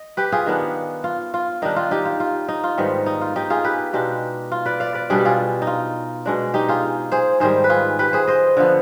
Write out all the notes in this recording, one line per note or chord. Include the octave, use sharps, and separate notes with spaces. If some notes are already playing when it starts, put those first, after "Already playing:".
Already playing: D#5
G4 B4
F4 G#4
D#3 B3 D4
F4
F4
D#3 G3 D4 D#4
F4
D#4 G4
F4
F4
D#4
F4
G#2 D#3 G3 B3
D#4
F4
D#4 G4
F4 G#4
G4 B4
B2 G#3 D4 D#4 G4
F4
B4 D5
D5 F5
B4 D5
B2 G3 D4 G#4
G4
F4 G#4
D#4
F4
B2 G#3 D4
D#4 G4
F4 G#4
G#4 C5
G#2 D#3 G3 G#4 C5
B4
F4 G#4
G4 B4
G#4 C5
C5 D#5
D3 F3 B3